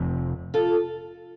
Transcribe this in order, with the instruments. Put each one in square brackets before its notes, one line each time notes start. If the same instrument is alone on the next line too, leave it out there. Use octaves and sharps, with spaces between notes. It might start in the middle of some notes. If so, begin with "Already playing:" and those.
Already playing: [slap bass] F1 F2 C3 F3
[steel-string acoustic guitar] F4 A4